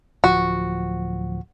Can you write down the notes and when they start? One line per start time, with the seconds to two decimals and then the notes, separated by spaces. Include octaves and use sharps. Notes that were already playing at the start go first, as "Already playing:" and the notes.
0.24 D1 F3 F#4